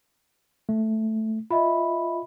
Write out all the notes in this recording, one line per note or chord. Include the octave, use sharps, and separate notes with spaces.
A3
F4 D#5 E5 B5